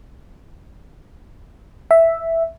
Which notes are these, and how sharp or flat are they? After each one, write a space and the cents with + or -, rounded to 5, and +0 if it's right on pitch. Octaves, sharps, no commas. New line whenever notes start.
E5 +0